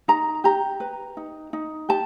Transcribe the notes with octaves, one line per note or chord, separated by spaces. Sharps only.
D#4 A#5
G4 A#5
B4
D#4
D#4
G4 A5